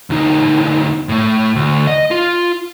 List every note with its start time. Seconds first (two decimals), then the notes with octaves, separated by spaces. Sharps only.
0.10 D2 D#4
1.09 A2 A3
1.56 D2
1.87 D#5
2.11 F4